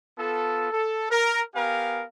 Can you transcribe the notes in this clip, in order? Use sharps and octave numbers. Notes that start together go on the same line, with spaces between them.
B3 F4 A4
A4
A#4
B3 G4 A#4 F5 G#5